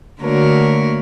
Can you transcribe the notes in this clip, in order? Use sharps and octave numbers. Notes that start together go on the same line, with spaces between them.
D3 A3 A#3 F#4 A#4 C#5